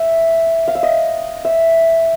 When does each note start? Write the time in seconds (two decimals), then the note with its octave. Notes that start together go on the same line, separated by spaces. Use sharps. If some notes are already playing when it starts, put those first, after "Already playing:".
Already playing: E5
0.68 F5
0.75 E5
0.83 D#5
1.45 E5